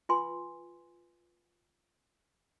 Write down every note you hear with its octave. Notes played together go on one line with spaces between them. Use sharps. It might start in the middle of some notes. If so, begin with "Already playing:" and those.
F4 B4 G#5 C6